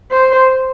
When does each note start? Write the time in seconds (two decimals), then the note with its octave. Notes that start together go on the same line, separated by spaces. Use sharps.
0.11 C5